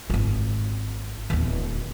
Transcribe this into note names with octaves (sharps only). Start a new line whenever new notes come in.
G#1 F4
D1 E2